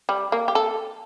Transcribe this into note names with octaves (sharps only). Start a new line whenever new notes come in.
G3
A#3
G4
A4